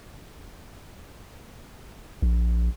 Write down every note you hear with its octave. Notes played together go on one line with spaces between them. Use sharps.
A#1